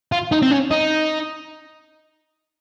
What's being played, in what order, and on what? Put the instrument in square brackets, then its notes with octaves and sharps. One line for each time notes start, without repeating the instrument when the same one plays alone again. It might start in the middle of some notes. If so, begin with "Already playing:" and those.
[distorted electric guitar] F4
D#4
C4
C#4
D#4